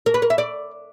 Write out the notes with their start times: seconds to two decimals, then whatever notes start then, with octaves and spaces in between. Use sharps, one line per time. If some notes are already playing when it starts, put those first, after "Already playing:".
0.06 A#4
0.14 B4
0.22 A#4
0.30 E5
0.38 D5